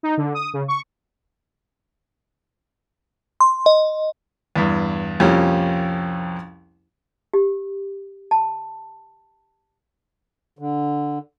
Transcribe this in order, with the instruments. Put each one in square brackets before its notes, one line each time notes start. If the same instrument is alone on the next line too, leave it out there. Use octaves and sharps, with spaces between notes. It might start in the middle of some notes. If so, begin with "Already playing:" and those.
[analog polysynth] D#4
D3
D#6
C#3
C#6
[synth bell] C6
D#5
[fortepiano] E2 G2
C2 F2 F3 A#3 C#4 G4
[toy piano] G4
A5
[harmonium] D3